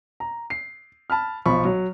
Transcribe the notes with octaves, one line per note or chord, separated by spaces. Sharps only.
A#5
C7
A5 B5 F6
B1 F3 B5 C#6
F#3